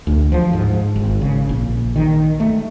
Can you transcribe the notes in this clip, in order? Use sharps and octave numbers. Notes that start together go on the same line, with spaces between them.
D2
F3
G#2
G#1
C#3
A#1
D#3
A3